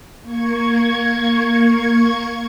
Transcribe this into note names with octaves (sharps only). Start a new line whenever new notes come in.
A#3 C#6 G#6